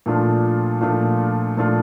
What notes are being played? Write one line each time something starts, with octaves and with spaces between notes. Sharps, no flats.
A#2 F3 A3 D4 F4
A#2 F3 A3 D4 F4
A#2 F3 A3 D4 F4